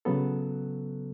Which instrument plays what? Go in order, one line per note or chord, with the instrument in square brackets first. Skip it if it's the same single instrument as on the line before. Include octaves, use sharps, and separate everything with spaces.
[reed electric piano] C#3 F#3 B3 A4